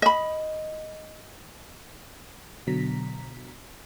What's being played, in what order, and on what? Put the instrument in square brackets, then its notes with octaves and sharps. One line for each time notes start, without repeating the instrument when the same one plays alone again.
[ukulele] D#5 B5
[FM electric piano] B2 D3 F#3 A#5 B6